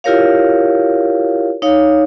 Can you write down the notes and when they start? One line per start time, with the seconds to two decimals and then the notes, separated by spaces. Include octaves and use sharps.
0.04 E4 F4 G4 A#4 C#5 F5
1.62 D#4 C#5 F5